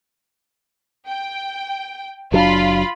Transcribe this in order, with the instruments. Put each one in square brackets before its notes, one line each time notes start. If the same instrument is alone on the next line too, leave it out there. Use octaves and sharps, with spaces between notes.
[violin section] G5
[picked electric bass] F#1 F#3 D4 [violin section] F4 B5